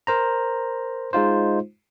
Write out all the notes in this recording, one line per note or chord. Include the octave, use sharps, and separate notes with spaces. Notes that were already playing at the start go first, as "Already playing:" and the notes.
A#4 C5 A#5
G#3 D#4 F4 C5